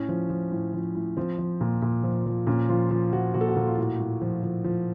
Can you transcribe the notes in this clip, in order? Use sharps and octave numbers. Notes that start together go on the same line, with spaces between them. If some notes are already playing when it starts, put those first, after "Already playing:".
Already playing: A2 C#4
F3
F3
A2
F3
A2
F3 C4
F3
A#2
A#2
F3
F3
A#2 C#4
F3 F4
F3
F3 F#4
A#2 F#4
A4
F#4
A#2 A4
F4
A2 F#4
A2
F3
F3
F3